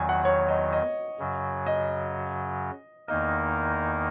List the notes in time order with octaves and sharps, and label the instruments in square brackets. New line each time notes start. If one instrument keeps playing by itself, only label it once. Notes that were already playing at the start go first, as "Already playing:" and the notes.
Already playing: [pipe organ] E2 D#3 F#3 [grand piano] G#5
[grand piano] F#5
C#5
D#5
D#5
[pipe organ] F#2 C#3 F#3
[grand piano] D#5
[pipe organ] E2 D#3 A#3 D#4 A#4 [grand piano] D#5